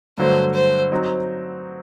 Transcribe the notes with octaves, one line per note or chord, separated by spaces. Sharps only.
G2 D3 F#3 A3 C5
C5
F#3 C4 D#4